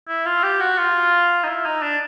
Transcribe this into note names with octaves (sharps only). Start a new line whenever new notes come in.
E4
F4
G4
F#4
F4
D#4
E4
D#4
D4